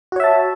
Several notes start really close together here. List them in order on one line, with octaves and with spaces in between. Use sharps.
F#4 C#5 E5 A5